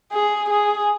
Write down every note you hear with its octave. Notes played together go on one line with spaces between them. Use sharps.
G#4
G#4